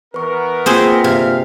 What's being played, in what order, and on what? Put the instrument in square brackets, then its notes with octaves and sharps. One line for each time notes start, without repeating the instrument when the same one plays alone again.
[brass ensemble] E3 B3 A#4 [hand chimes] B4 C#6
[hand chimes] A#3 F4 B6 [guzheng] C4 G#4 C5
[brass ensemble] G1 F5 [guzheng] C3